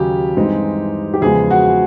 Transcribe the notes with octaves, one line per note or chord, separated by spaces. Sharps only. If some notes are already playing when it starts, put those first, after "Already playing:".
Already playing: D#2 C#3 F#3 G4
G2 E3 G#3 C4 D#4
G4
E2 C#3 F3 G#3 B3 G#4
F#4